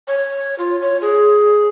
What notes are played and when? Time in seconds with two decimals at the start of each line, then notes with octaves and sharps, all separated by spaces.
0.08 C#5
0.59 F4
0.82 C#5
1.02 G#4